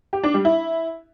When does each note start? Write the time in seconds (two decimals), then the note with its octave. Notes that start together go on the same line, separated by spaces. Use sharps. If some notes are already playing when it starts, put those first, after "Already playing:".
0.13 G4
0.23 D4
0.34 G3
0.45 E4